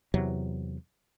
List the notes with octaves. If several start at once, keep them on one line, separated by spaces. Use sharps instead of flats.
E2 C3 F#3